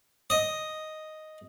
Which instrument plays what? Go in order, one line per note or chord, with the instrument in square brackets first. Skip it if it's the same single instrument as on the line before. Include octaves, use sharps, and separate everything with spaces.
[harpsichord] D#5